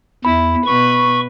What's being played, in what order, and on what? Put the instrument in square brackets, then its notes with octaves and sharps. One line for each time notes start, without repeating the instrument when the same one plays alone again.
[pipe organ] E2 [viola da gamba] E4 [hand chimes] B5
[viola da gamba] B2 B4 [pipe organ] C#6